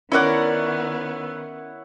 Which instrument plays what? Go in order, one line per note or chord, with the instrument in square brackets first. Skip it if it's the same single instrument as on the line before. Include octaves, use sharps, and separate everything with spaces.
[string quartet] D#3 B3 [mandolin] C#4 A#4 D5 [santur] E4 C#5 F#5